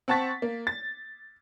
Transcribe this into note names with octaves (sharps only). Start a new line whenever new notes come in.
C4 F#5 A5 C#6 A6 B6
A#3
A6